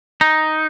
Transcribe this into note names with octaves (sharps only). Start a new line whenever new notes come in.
D#4